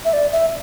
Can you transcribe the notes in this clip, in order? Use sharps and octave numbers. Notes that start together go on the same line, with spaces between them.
E5
D5
E5